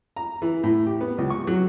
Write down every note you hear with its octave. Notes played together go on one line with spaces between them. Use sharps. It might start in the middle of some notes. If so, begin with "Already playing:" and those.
A#5
E3
A2
G4
B3
C#2
C#6
F#3